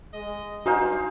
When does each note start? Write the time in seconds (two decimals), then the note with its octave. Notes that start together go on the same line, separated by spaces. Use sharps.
0.14 G#3 D#5
0.66 G2 D#4 F#4 C5 F5 G#5 A#5